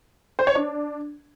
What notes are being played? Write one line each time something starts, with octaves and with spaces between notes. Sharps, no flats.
C5
C#5
D4